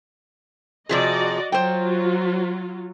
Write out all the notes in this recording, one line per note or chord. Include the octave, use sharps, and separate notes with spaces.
C3 F3 F#4 G#4 D5 D#5
F#3 F4 C5 G5